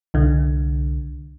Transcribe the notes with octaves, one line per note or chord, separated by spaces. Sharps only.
C2 D3